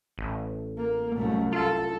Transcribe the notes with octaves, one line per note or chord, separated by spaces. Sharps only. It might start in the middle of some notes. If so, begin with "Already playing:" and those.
A1
A#3
C2 F#2 A3
F4 A4